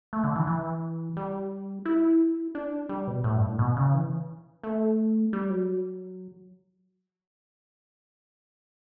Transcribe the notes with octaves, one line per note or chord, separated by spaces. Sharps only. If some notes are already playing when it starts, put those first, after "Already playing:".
A3
D3
E3
E3
G3
E4
D4
G3
B2
A2
G2
A2
B2
C#3
E3
A3
G3
F#3